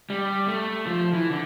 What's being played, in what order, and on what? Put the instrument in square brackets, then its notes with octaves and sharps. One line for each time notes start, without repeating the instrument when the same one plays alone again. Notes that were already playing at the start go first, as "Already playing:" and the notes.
[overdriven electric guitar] G3
A3
F3
E3
D3